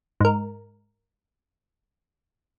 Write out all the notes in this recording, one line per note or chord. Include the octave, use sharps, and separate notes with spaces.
G#2 A#4